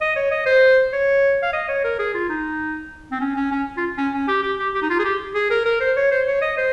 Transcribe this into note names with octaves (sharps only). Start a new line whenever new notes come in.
D#5
C#5
D#5
C5
C#5
F5
D#5
C#5
A#4
G#4
F4
D#4
C4
C#4
C#4
C#4
F4
C#4
C#4
G4
G4
G4
G4
D#4
F4
G#4
G4
G#4
A#4
A#4
C5
C#5
C5
C#5
D#5
C5